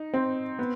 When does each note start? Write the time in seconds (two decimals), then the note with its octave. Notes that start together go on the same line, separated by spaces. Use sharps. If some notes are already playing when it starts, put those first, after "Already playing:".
Already playing: D#4
0.14 C4
0.59 B3